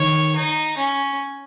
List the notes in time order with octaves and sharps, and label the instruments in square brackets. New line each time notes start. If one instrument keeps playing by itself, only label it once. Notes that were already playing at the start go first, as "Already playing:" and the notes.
Already playing: [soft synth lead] D#3 [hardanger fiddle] C#5
[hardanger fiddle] D#4
C#4